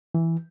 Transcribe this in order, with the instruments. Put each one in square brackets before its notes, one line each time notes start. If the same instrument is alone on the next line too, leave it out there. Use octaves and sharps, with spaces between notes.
[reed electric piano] E3